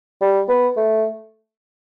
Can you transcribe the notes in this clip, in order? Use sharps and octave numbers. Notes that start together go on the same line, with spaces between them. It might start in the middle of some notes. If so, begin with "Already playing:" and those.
G3
B3
A3